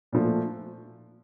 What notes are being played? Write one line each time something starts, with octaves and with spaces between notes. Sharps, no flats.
A#2 F3 A3